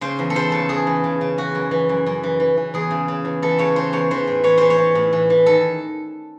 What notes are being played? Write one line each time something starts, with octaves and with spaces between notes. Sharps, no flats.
C#3 C5
E2
A4
E2 C5
C#3 A4
E2 G#4
E3
C#3
C#3
E3 F#4
F#2
E3
F#2
F#2
E3
E3
E3
E2 G#4
C#3
C#3
E2
E3 A4
C#3 C#5
E3 C5
E2 C#5
E3 C5
A2
E3 C#5
E3 C5
C#5
E3
A2
E3
E3
D#3 A4